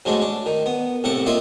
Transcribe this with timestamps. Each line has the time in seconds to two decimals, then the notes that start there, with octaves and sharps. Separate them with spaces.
0.05 G#2 F#3 G#3 A3 D4
0.21 D4
0.46 D#3
0.66 B3
1.04 C2 A2 A3 F#5 A5 D6
1.26 A#3 D4 F4 D#5 E5